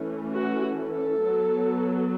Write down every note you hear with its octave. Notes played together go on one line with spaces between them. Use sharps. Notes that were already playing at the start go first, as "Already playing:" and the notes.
Already playing: E3 A3 C#4
F#4
A4
F#3 B3